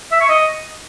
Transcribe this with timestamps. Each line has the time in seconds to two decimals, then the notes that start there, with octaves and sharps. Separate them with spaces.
0.12 E5
0.21 C#6
0.29 D#5